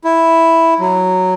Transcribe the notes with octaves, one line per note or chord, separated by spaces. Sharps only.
E4
F#3